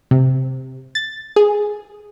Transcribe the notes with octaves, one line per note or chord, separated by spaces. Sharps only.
C3
A6
G#4